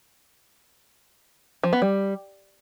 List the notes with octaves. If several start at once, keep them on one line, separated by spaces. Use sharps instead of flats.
F3
B3
G3